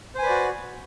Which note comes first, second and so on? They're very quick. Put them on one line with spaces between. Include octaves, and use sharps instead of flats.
C5 G#5 B4 D5 F#4